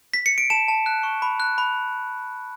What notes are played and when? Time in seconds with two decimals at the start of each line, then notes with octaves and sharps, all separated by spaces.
0.14 B6
0.26 C#7
0.38 D7
0.50 A5 E7
0.68 A5
0.86 F#6
1.03 C#6
1.22 B5
1.40 F#6
1.58 B5